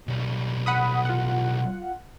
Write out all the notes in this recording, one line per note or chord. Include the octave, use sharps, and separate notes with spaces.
B1 G3
F#5 B5 D#6
F4 F#5